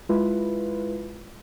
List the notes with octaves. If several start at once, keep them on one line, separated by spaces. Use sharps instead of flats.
G#3 E4 F4 B4